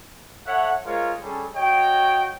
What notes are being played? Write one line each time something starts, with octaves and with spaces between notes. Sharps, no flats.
A4 C#5 E5 F#5
G#3 F4 A#4 C5 C#5 F5
G3 C#4 G#4 A4
F#4 C#5 D#5 G5